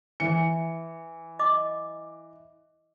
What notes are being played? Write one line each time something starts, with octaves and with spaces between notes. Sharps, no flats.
E3 C#7
D#5 D6